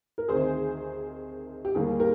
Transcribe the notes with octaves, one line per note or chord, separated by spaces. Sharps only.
A#4
D2 C3 D#3 G#4 C5
G4
D#2 D3 G3 A#3 G#4
G4 A#4